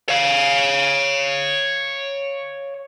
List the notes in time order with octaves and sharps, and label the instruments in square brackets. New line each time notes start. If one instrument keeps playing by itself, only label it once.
[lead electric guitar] C#5 F5